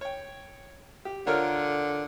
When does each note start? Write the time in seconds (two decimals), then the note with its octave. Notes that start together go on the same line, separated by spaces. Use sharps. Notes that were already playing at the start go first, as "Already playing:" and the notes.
0.01 C#5 G5
1.05 G4
1.27 D3 F4 A#4 C#5